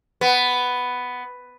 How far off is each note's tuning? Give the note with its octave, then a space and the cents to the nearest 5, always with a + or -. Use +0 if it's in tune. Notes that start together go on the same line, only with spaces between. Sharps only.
B3 +5